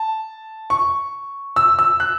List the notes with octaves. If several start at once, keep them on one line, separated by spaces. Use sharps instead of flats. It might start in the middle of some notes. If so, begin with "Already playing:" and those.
Already playing: A5
C#6
E6
E6
F#6